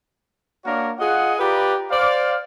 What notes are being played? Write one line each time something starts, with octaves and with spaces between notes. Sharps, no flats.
A#3 D4 F#4 A#4 C#5
F4 G#4 D#5 F#5
F4 G4 B4 D5 A#5 B5
C5 D5 F5